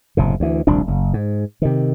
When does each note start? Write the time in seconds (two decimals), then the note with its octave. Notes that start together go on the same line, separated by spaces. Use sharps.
0.17 F#1 A2 C3
0.40 D2 E3
0.67 D#1 C2 F3 D4
0.88 F#1
1.13 G#2
1.62 C3 D#3